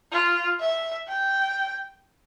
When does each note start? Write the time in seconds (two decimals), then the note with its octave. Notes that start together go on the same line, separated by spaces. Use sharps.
0.12 F4
0.60 E5
1.08 G5